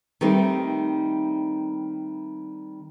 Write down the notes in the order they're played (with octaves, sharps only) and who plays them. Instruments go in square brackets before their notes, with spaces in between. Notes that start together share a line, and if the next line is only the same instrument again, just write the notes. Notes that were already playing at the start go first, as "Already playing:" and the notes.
[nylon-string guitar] D#3 G3 A3 C4 D#4